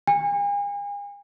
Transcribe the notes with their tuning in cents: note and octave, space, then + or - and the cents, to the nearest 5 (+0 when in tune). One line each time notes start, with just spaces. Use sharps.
G#5 -45